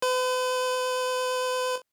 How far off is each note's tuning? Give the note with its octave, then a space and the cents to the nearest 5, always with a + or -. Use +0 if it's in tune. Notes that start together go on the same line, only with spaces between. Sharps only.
B4 +45